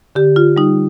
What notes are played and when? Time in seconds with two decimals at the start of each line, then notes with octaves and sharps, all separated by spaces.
0.15 D3 G4
0.36 F4
0.56 G3 D#4